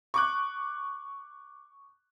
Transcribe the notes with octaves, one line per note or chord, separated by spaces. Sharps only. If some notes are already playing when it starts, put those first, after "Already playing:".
C#6 D6 F#6